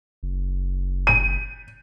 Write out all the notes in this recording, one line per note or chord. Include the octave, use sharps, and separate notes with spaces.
F#1
D#7